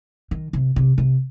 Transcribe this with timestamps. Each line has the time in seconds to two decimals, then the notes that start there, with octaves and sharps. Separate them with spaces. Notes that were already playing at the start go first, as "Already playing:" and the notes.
0.31 D#3
0.53 C3
0.76 C3
0.98 C3